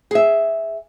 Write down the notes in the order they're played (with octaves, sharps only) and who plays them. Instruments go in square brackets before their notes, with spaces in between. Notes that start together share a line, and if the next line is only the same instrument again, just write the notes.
[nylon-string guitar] G#4 E5